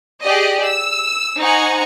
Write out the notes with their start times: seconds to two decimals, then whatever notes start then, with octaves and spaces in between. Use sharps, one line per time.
0.23 G4 G#4 D5 D#5
0.64 E6
1.39 D#4 C5 F#5 G#5 A#5 C#6